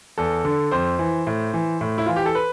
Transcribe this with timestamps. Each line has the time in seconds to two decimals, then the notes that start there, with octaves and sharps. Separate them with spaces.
0.18 E2 A4
0.45 D3
0.71 F2 C5
0.99 E3
1.27 A2
1.54 E3
1.81 A2
1.98 E4
2.06 E3 F4
2.16 G4
2.26 A4
2.35 B4